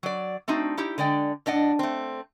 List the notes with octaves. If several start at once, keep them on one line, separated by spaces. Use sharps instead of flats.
F#3 D5
A3 C4 D4 D#4 F#4
D#4 E4 G4
D3 G#3 D5 G5
A2 D4 D#5 F#5
A3 C4